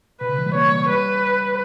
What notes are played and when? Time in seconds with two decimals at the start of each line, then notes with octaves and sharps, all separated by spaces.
0.21 B2 B4
0.29 C#3
0.39 E3
0.46 G3
0.54 A#3 C#5
0.72 G3
0.89 G3 B4